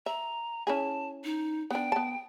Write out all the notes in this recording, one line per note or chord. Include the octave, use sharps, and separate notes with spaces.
E5 A#5
C#4 E4 G#4 A5
D#4
B3 D4 G5
B3 A5